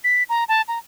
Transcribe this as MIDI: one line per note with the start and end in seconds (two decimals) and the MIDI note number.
0.04 0.23 95
0.29 0.44 82
0.48 0.62 81
0.68 0.79 82